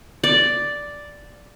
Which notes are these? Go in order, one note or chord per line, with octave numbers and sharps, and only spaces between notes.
D5